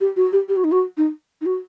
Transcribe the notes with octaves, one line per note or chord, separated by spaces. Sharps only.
G4
F#4
G4
G4
F#4
D#4
F#4
D#4
D#4
F#4